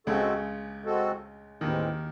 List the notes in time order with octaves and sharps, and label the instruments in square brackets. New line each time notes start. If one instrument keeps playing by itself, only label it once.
[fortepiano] C#2 C#3 [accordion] G#3 C4 F#4 A4
[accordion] G#3 C4 F#4 A4
[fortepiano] D#2 D#3 [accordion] A2 E3 G#3 C4